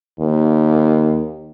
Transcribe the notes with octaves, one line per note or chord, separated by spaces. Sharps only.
D#2